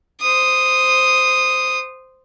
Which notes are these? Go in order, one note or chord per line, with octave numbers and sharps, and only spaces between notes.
C5 D#6